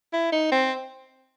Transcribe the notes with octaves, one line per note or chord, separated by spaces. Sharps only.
E4
D#4
C4